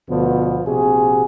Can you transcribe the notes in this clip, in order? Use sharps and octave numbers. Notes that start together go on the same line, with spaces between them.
D2 B2 D3 F3 B3
A#1 C3 F#4 G#4